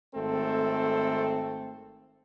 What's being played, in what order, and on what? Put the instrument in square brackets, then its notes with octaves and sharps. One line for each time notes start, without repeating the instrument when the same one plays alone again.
[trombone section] G#1 A3 C4 A4